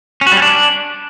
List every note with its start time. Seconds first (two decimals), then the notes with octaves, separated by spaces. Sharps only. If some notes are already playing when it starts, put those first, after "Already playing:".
0.21 C#4
0.27 F#4
0.32 G3
0.37 C#4
0.42 D4